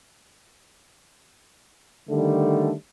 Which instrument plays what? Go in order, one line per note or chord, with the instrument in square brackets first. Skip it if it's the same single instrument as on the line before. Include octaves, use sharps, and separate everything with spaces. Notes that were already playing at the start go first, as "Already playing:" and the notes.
[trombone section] D3 D#3 G3 A3